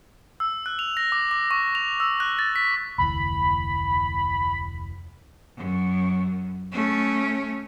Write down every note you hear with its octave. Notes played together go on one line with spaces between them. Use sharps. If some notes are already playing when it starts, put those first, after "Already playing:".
E6
F#6
F7
A#6
D6
D6
C#6
F7
E6
F#6
A6
B6
F1 D2 E3 B5
F#2
A3 C#4